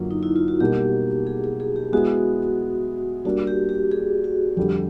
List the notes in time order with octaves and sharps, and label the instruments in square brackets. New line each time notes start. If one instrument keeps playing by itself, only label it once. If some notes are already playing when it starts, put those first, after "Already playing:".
Already playing: [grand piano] F#2 D3 F#3 A#3 [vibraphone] F4
[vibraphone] D#4
E4
F4
F#4
[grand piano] B2 G3 A#3 D#4 [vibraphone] G4
[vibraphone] G#4
G#4
G#4
G4
[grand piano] G#3 B3 E4 G#4 [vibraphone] F#4
[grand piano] G3 A#3 D4 [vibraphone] F#4
[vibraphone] G4
G4
G#4
F#4
[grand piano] F2 D3 G3 [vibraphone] G4